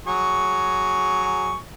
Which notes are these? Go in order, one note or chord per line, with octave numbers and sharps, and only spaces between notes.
F#3 G#4 C#6